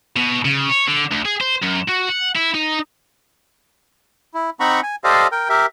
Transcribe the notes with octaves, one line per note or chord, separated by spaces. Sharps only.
B2
C#3
C#5
D3
D2
G#4
C5
F#2
F#4
F#5
E4
D#4
E4
C4 D#4 F#5 A#5 B5 C#6
G#5
G4 A4 C5 D5 D#5 F5
A#4 G5
G4 A#4 E5